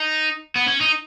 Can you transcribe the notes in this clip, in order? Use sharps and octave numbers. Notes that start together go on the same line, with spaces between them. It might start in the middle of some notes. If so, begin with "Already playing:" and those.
Already playing: D#4
B3
C#4
D#4